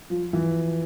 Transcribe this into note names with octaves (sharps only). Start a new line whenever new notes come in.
F3
E3